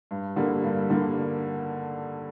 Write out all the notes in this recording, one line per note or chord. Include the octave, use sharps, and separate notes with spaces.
G2
D3 G3 A#3
G2
D3 G3 A#3